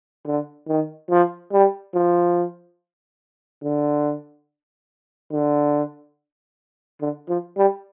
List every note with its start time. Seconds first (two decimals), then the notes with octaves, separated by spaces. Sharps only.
0.26 D3
0.68 D#3
1.10 F3
1.52 G3
1.95 F3
3.63 D3
5.32 D3
7.01 D3
7.29 F3
7.57 G3